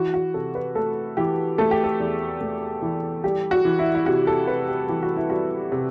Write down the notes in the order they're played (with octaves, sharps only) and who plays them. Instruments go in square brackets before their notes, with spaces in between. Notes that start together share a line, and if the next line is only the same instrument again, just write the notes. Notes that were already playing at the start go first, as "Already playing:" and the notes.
Already playing: [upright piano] E3 F#4
F#4
C3 A4
B4
A3 A4
E3 G4
A3 A4
G4
A4
E2
A3
E3
G3 G4
F#4
E3
E4
E4
C3 F#4
A4
C3 B4
G4
E3 G4
F#4
E4
G3 F#4
C3